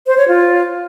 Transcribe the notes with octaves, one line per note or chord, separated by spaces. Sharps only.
C5
C#5
F4